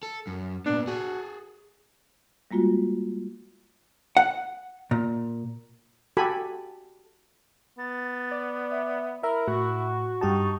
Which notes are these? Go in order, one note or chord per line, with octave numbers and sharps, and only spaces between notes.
A4
F#2
A#2 B3 D4
F#4 G#4 A4
G3 G#3 A#3 F4 F#4
F#5
A#2
F#4 G4 A4 G#5 B5
B3 A6
D5
E5
E4 A#4 E5 B5
A2 F#4 C#6
G2 D#4 G4 A5